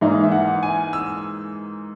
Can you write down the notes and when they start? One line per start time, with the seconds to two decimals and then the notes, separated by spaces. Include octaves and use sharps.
0.01 G#2 E3 A#3 D#4 E5
0.24 E5
0.32 F#5
0.63 G#5
0.93 E6